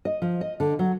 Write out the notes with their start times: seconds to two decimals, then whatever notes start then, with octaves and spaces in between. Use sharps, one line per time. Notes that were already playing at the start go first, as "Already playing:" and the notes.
0.05 D#5
0.22 F3
0.41 D#5
0.60 D3
0.79 F#3